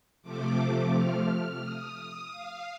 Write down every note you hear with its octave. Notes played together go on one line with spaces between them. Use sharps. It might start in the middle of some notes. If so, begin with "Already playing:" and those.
C3 F3 A3 D6
F6
D#6
F5